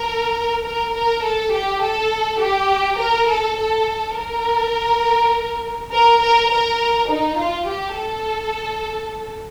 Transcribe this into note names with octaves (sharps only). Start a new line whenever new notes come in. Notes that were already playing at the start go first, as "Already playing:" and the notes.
Already playing: A#4
A#4
A#4
A4
G4
A4
G4
A#4
A4
A4
A#4
A#4
A#4
A#4
D#4
F4
G4
A4